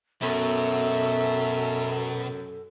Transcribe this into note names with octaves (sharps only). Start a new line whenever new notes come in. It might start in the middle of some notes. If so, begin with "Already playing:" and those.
F#2 B2 A4 E5